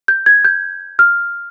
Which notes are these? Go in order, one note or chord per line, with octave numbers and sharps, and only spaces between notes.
G6
G#6
G6
F6